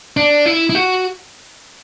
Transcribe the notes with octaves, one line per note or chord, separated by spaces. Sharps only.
D4
E4
E4
F#4